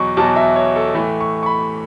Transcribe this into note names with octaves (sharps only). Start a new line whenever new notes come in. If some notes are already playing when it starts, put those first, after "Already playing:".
Already playing: E2 B2 F#3 C#6
E2 B2 F#3 A5
E5
C#5
A4
A2 E3 A3
C#6
C#6
B5